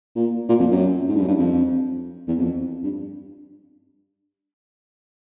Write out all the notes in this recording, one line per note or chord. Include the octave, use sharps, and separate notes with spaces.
A#2
A#2
F2
F#2
G#2
G2
F#2
G2
F2
E2
F2
G2